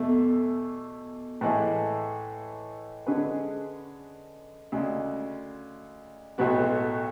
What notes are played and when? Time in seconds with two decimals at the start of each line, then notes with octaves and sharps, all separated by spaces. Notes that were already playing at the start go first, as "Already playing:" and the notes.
Already playing: E2 B2 A3
1.41 A2 E3 G#3
3.06 D3 G#3 C#4 G#4 B4
4.72 D2 C#3 G#3 C#4
6.38 B1 A2 G#3 B3 F#4